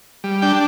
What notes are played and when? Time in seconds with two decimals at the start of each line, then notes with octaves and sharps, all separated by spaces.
0.24 G3
0.42 D4 G5